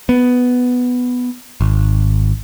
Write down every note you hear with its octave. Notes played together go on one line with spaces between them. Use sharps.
B3
G#1